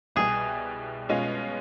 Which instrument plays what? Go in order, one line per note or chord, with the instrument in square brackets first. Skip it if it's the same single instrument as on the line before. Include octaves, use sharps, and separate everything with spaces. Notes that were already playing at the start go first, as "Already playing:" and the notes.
[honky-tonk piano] C2 B2 G3 [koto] G#4
[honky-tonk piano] B2 G#3 C#4 F4